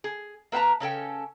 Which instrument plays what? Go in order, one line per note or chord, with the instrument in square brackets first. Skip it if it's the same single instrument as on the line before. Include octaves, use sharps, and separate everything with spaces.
[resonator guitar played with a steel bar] G#4
A#3 B4 F#5 A5 A#5
C#3 C#4 A4 G5